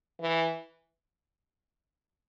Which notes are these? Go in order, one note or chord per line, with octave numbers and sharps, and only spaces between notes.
E3